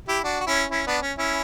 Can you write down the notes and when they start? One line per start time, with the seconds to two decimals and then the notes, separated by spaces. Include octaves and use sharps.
0.08 E4 G4
0.24 D4 F#4
0.40 F#4
0.47 C#4 E4
0.71 C#4 E4
0.87 B3 D4
1.02 C#4
1.18 C#4 E4